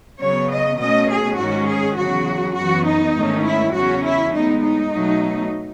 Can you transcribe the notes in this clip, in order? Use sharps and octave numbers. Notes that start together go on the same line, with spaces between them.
C#3 F#3 B3 C#5
D#5
B2 A3 C#4 D#5
G#4
G#2 D#3 G#3 C#4 F#4
G#4
E2 C#3 F#3 F#4
F#2 E3 B3 F#4
D#4
G#2 D#3 A3 C#4
E4
E2 C#3 F#3 C#4 F#4
E4
A2 G#3 B3 D#4
D#4
B2 F#3 A3